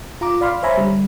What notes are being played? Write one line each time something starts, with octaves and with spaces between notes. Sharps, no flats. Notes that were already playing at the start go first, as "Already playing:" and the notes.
F4 A#5 D6
D5 F5 B5 C6 F6
C5 C#5 E5 G#5 A#5 B5
D3 G3